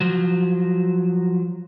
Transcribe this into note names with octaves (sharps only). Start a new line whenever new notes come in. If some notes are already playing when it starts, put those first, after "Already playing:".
F3 F#3